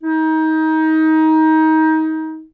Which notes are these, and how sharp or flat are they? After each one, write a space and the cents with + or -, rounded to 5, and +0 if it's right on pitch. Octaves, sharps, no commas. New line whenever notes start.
D#4 +25